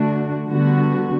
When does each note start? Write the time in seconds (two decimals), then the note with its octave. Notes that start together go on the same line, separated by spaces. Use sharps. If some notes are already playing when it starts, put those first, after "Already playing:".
Already playing: D3 A3 D4 F#4
0.49 D3 G3 B3 F#4